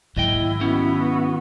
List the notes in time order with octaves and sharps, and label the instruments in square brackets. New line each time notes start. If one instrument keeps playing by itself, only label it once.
[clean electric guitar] D#2 D#5 G5 [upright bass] G#2 F#3 [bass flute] E4
[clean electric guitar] D#3 C#4 [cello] B3 F#4